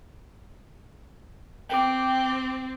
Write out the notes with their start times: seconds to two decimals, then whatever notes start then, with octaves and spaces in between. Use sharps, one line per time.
1.70 C4 G5 D6